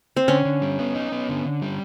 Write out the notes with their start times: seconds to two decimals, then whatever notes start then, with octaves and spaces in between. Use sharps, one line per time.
0.16 C4
0.28 D3 C#4
0.45 D3
0.62 G3
0.79 B3
0.95 D#4
1.12 B3
1.29 D3
1.45 D3
1.62 G3